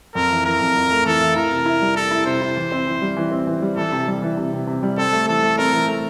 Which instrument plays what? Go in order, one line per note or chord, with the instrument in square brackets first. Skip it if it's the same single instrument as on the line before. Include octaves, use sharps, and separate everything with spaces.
[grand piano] F2 [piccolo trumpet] A#4
[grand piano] E3
[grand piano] E3 [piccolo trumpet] A#4
[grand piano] F2
F2
A3
[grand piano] E3 [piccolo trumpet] A4
[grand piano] E3
[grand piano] E4 [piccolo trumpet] A#4
[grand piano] C3
E4
G3
[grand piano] E4 [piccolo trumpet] A4
[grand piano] E4
[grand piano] C3 [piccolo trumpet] C5
[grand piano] E4
E3
C4
E3
G3
E3
C4
E3
G3
[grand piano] E3 [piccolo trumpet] A4
[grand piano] C3
G3
E3
C3
C3
C3
G3
[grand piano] C4 [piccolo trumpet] A4
[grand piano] A3
[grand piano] E3 [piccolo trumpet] A4
[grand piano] A3
[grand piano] C4 [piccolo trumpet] A#4
[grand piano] E3
A3